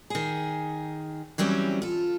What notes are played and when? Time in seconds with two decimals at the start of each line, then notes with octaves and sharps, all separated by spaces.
0.10 D#3 G#4
1.38 E3 F#3 G3 C4 C#4
1.82 F4 A4